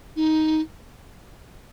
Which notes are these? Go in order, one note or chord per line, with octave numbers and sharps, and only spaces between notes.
D#4